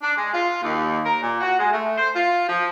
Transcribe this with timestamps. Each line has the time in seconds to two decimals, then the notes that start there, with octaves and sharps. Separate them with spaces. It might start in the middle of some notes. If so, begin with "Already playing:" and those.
0.01 D4
0.15 G#3
0.33 F4
0.63 D#2
1.05 A#4
1.22 A#2
1.41 F#4
1.58 G#3
1.71 A3
1.98 C5
2.14 F4
2.49 F3